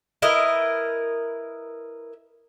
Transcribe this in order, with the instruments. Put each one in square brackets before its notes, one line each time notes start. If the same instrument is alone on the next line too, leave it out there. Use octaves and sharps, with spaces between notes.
[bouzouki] E4 A#4 B4 D#5